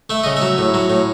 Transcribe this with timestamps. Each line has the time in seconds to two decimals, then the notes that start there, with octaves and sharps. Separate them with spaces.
0.10 A3 E5
0.24 C#3 D#5
0.37 F#3 E5
0.58 A2
0.74 F#3
0.90 A2